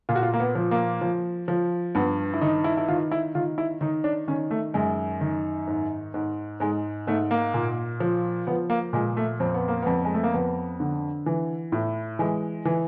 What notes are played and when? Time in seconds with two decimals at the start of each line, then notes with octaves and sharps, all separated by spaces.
0.09 A#2 F4
0.16 F#4
0.23 F4
0.34 A#3
0.40 B3
0.55 F3
0.71 A#3
1.01 F3
1.48 F3
1.95 G2 B3
2.34 E4
2.41 D#3 D#4
2.64 E4
2.77 E4
2.89 D#3 F4
3.11 E4
3.35 D#3 F4
3.58 E4
3.81 D#3 D#4
4.04 D4
4.28 D#3 C#4
4.51 A3
4.74 F#2 G#3
5.21 D#3
5.67 G#2
6.14 G#2
6.60 G#2 G#3
7.07 G#2 A3
7.31 A#3
7.54 A#2
8.00 F3
8.47 F3 B3
8.70 A#3
8.93 A#2 G#3
9.17 A3
9.40 F2 C4
9.54 B3
9.68 A#3
9.82 F2 B3
10.05 G#3
10.14 A3
10.24 A#3
10.33 F2 B3
10.80 D3
11.26 E3
11.72 A2
12.19 E3 G#3
12.65 E3